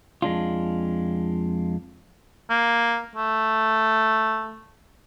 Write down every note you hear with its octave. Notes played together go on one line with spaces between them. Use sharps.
F2 G#3 D4 F4
A#3
A3